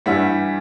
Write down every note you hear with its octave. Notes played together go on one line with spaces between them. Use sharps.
G2 E3 G3 E5 F#5